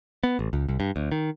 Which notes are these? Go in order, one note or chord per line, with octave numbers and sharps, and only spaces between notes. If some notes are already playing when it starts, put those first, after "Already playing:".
B3
A1
C#2
C2
G2
D2
D#3